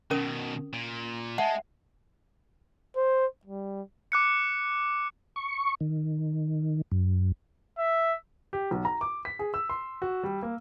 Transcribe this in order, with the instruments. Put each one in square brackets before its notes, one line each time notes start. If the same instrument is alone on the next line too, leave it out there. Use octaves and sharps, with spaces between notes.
[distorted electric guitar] B2 D#3 [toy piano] C#4 A#4 D#6
[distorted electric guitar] A#2
[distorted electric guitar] G#3 [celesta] E5 [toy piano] F#5 [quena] A5
[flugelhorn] C5
G3
[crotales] D6 F#6 C#7
[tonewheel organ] C#6
D#3
F#2
[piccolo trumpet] E5
[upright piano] G4
B1
A#5
D6
B6
G#4
E6
C6
F#4
G3
A#3